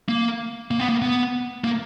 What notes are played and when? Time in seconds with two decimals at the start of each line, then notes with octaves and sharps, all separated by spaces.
0.09 A#3
0.71 A#3
0.79 B3
0.89 A#3
1.02 B3
1.64 A#3